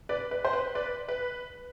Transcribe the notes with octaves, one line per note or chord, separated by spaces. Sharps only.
B4 D5
B4
C5
B4
B4 D5
B4